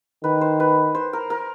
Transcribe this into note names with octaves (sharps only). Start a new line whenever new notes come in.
D#3 B4
C5
B4
C5
A#4
A#4